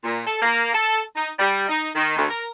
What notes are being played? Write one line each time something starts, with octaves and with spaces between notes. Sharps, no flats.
A#2
A4
A#3
A4
D#4
G3
D#4
D#3
D2
A#4